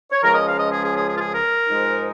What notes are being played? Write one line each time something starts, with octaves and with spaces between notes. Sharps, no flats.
C#5
C#2 C#3 F3 G#3 A#4
D#5
F5
D#5
G#4
G#4
G#4
G#4
F4
G#4
A#4
G#2 F3 G#3 D#4